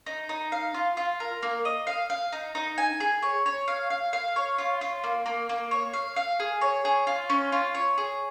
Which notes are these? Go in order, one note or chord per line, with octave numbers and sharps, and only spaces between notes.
D#4
D#4
F5
F4
F4
A#4
A#3
D#5
F5
F5
D#4
D#4
G#5
G#4
C#5
C#5
F5
F5
F5
C#5
F4
F4
A#3
A#3
A#3
C#5
F5
F5
G#4
C#5
G#4
F4
C#4
F4
C#5
G#4